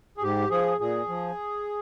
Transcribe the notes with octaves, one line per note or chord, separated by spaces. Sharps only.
G#4
G#2 G4
F3 G#4
A#2 G#4
F3